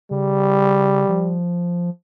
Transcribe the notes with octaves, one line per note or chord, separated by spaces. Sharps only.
C#3 G3
F3